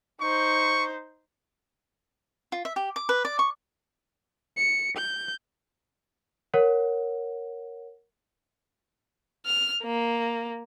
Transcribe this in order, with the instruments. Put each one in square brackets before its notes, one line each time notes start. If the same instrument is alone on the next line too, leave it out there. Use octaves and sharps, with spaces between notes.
[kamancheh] D#4 C5 [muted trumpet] C#6
[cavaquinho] F4
E5
G4
D6
B4
D5
C#6
[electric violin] C#7
G6
[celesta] A#4 C#5 F#5
[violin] F6
A#3